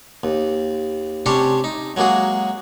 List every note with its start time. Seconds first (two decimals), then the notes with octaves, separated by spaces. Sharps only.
0.23 D#2
1.26 C3 C#4 D4 G4 C5 C#5
1.64 D#4
1.96 F#3 G#3 A#3 F#4 G#4